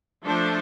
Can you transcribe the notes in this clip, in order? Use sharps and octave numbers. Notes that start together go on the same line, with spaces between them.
F3 A3 D4 A4 C5